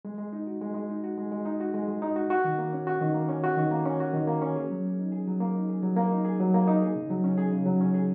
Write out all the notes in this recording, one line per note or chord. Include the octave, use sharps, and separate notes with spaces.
G#3
G#3
D#4
F#4
G#3
G#3
D#4
F#4
G#3
G#3
D#4
F#4
G#3
G#3
D#4
F#4
F#4
D#3
A#3
C#4
F#4
D#3
A#3
C#4
F#4
D#3
A#3
C#4
F#4
D#3
A#3
C#4
G#4
F#3
A#3
D#4
G#4
F#3
A#3
D#4
G#4
F#3
A#3
D#4
G#4
F#3
A#3
D#4
G#4
C#3
F#3
C#4
G#4
C#3
F#3
C#4
G#4